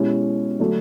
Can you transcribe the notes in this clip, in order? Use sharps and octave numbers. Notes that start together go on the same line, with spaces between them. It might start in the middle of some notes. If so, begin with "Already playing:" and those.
Already playing: B2 G#3 C#4 E4 G4
D3 F#3 A3 D4 F#4